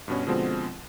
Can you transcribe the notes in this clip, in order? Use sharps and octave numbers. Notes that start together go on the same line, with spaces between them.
G2 B2 C#4
B2 D3 F3 G#3 C4